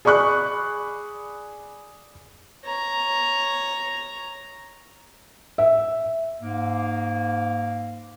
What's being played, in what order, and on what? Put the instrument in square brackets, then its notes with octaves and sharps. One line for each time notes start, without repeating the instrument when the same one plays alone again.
[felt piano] G#4 D5 B5 C#6 F#6
[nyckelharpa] C#5 A#5
[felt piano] E5
[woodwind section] G#2 A#3